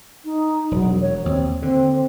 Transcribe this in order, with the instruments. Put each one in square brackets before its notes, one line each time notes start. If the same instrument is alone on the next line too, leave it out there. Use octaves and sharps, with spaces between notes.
[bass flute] D#4
[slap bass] E1 [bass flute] F#3
[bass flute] C#5
[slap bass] D#2 [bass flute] C4
[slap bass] D3 [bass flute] C4